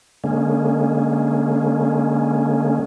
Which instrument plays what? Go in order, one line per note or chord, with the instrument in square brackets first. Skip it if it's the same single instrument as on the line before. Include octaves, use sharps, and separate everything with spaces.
[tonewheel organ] D3 G#3 A#3 C#4